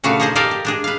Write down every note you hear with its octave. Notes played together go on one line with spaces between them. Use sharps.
A#2 C#3 A3 D4 F#4 F5
F3 D#4 G#4 C5 D#5
G4 A4 A#4 D5 D#5 F5
G4
G#3 D4 G#4
B4 F5